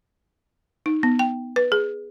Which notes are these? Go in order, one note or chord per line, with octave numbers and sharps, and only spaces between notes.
D#4
B3
G5
B4
G#4